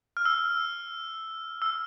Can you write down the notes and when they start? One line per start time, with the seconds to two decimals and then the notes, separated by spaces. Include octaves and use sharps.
0.17 F6
0.25 E6
1.62 E6